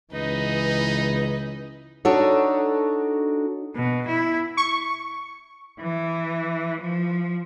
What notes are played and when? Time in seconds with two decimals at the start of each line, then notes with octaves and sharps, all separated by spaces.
0.13 C#2 E3 D#4 B4 D#5
2.05 D4 D#4 F#4 A4 C#5
3.74 B2
4.07 E4
4.57 C#6
5.80 E3
6.81 F3